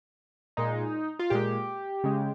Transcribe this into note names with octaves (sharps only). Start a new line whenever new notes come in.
A#2 G#3 D#4
F4
A#2 G#3 G4
C#3 G#3